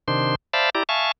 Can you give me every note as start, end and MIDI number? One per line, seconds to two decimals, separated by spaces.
0.08 0.35 48
0.08 0.35 51
0.08 0.35 62
0.08 0.35 72
0.08 0.35 84
0.53 0.70 72
0.53 0.70 74
0.53 0.70 76
0.53 0.70 77
0.53 0.70 81
0.53 0.70 83
0.75 0.83 64
0.75 0.83 67
0.75 0.83 74
0.75 0.83 82
0.89 1.12 76
0.89 1.12 77
0.89 1.12 80
0.89 1.12 81
0.89 1.12 85